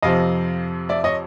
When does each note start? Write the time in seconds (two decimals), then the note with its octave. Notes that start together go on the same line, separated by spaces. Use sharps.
0.02 F2 C3 F3 D#5 F5
0.89 D5 E5
1.04 C#5 D#5